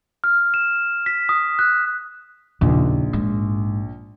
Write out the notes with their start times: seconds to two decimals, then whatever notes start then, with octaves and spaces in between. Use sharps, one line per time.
0.24 F6
0.54 E7
1.06 B6
1.29 D#6
1.59 F#6
2.61 A#1 D#2 C#3
3.13 G#2